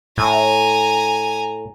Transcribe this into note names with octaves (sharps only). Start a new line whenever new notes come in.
A2 G#5 A#5